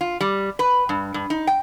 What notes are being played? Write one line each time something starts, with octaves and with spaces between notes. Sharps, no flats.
F4
G3
B4
G2
G2
D#4
G5